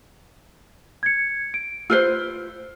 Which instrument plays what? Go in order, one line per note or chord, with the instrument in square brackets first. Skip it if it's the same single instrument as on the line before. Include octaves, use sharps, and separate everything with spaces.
[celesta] G#6 C#7
D7
[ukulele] F4 B4 C5 [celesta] E6